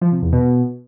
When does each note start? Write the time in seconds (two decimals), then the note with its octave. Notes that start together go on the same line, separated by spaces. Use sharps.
0.01 F3
0.12 C3
0.22 E2
0.32 B2